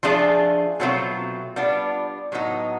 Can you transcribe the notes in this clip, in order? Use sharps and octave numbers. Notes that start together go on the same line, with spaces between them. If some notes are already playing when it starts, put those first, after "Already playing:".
F3 A3 D4 F4 G#4
B2 F#3 A3 C4 F4
G3 B3 D4 F4
A2 F#3 B3 D#4